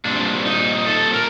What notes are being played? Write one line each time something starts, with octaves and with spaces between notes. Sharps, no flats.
A#2 G3 C4 D4
D#4
A4
A#4